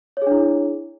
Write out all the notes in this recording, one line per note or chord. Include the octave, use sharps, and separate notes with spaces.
D4 E4 G#4 C#5